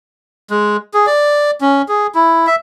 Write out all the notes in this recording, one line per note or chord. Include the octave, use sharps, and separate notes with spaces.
G#3
G#4
D5
C#4
G#4
E4
E5